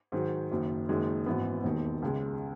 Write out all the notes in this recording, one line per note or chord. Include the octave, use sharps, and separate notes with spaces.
G#2 D#3 F#3
F#1 F#2 D#3
F#1 F#2 D#3 G#3 D#4
G#1 F#2 E3 B3
E1 D#2 D#3
C#2 C#3 G#3